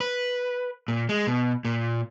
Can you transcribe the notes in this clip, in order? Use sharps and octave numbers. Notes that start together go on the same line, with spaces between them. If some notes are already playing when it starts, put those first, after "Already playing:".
B4
A#2
G#3
B2
A#2